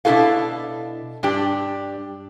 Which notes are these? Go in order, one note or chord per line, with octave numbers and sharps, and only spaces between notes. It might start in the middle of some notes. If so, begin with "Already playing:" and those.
B2 D4 E4 F#4 A4 F5
G2 D4 G4